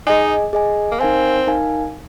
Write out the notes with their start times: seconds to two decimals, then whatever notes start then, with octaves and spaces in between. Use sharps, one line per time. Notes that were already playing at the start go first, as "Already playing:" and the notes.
0.07 D#4 G#4 D#5 G#5
0.53 G#4 D#5 G#5
0.92 A#3
1.00 C4 D#4 A#4 F5 G#5
1.47 D#4 A#4 F5 G#5